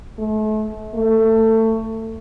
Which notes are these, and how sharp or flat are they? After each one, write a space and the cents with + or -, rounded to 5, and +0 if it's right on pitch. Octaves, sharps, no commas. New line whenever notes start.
A3 -35
A3 +20